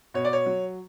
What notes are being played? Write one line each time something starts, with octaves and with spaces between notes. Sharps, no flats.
B2 C#5
D5
C#5
F#3